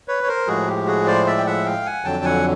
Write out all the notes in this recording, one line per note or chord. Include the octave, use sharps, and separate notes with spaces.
B4 C#5
C#5
A#4 C5
A2 F3 G#3 F#4 G#4
G4
F#4 G#4
C5 D5
D5 E5
G5
E5 F#5
F5 G5
F#5 G#5
F2 D3 F#3 G5 A5
F#5 G#5